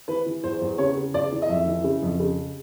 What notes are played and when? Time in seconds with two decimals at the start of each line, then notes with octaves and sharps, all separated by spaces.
0.08 E3 B4
0.26 E3
0.43 E2 C5
0.62 E2
0.78 C#3 C#5
0.97 C#3
1.14 E2 D5
1.32 E3
1.42 D#5
1.49 F2 E5
1.67 E3
1.84 C#3
2.02 F2
2.19 C#3